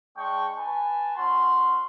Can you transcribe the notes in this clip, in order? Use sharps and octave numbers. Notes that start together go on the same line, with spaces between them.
G#3 D4 G5 C#6
B4 G#5 A5
C#4 F#4 C6